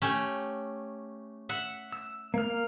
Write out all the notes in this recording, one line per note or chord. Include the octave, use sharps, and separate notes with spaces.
A3 C#4 G4
E5 F#5
E6
A#3 F6